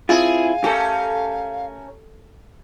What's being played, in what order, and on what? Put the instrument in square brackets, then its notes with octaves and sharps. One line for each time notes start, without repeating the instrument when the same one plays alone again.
[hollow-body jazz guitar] C4 E4 F4 [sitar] G#4 [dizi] F5
[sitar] A3 C#4 A#4 [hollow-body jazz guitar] G4 A4